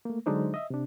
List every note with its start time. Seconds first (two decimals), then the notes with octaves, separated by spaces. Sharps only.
0.05 A3 A#3
0.26 D3 F#3 G#3 D4 D#4 C5
0.54 D#5 E5
0.70 C3 D4